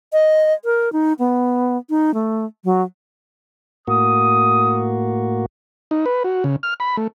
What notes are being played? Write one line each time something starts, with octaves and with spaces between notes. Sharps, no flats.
D#5
A#4
D#4
B3
D#4
A3
F#3
A2 A#3 F#4 D#6
D#4
B4
F#4
C#3
F6
B5
A3